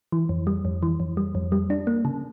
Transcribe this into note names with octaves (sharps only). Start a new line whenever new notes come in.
E3
F2
G3
F2
E3
F2
G3
F2
G3
D4
A#3
C#3